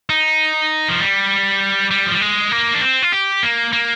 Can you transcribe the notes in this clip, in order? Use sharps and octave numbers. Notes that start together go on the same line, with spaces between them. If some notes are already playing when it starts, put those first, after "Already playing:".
D#4
F3
G3
G3
F3
G3
G#3
A#3
D4
C4
F4
G4
A#3
A#3